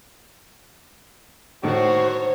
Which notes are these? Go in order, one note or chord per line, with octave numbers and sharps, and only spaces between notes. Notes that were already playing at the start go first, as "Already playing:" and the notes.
A2 D#3 A3 F#4 C5 C#5